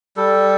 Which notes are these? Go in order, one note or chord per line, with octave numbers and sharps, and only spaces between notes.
G3 A4